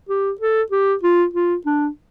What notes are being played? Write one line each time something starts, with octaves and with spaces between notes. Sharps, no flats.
G4
A4
G4
F4
F4
D4